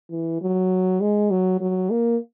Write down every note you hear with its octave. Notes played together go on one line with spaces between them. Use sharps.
E3
F#3
G#3
F#3
F#3
A#3